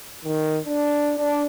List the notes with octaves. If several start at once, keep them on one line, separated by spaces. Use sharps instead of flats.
D#3
D4
D4